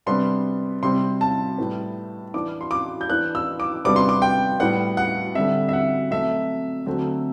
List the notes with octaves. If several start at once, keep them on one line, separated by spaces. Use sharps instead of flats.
C3 G3 B3 D4 C6
C3 G3 C4 C6
A5
A2 G3 B3
E3 B3 D4 D6
C6
D6
G6
E3 B3 D4 F#6
E6
D6
C3 G3 B3 D4 D6
C6
D6
G5
A2 G3 B3 F#5
F#5
D3 G3 C4 E5
E5
F#5
B2 F#3 A3 C4 E5
D3 F#3 A3 C4